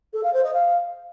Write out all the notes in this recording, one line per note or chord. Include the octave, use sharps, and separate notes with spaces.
A4
F5
C5
D#5
F5